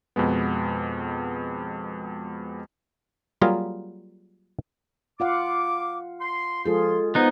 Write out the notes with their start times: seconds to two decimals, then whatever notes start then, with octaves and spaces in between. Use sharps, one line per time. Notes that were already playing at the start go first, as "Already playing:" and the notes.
0.16 F2 B2 G#3 B3
3.41 F#3 G3 A#3 F4 G#4 A#4
5.20 F4 F5 F#5 D6
6.21 C6
6.66 F3 G#3 F4 G#4 A4 C6
7.15 B3 D#4 G#4 C5 F#5